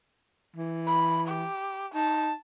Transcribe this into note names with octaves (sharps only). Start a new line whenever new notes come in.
E3
B5
G4
D#4 A5